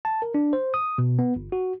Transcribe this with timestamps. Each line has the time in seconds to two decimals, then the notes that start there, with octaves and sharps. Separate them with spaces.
0.05 A5
0.22 A#4
0.35 D4
0.53 C5
0.74 D#6
0.98 B2
1.19 B3
1.36 G1
1.52 F#4